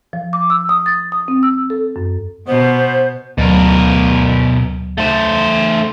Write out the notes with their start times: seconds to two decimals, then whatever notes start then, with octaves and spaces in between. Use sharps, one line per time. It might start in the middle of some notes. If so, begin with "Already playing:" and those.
0.13 F3
0.33 D6
0.50 E6
0.69 D#6
0.86 A6
1.12 D#6
1.28 C4
1.43 E6
1.70 A4
1.96 F#2
2.48 B2 B3 C5
3.38 D2 B2 F#3 A#4
4.98 A3 C5